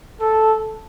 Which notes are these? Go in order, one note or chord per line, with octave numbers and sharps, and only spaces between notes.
A4